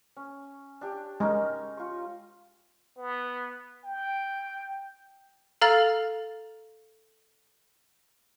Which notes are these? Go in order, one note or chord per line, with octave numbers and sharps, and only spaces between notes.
C#4
D4 G4
G#3 C#4 D#4 A#4
F4 C#6
B3
G5
A4 F5 A#5 F6 A6 F#7